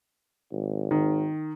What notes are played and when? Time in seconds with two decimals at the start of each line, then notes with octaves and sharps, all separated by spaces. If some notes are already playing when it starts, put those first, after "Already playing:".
0.52 G#1
0.91 D#3